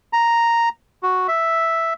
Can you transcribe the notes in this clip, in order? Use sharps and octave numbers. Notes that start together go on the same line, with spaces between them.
A#5
F#4
E5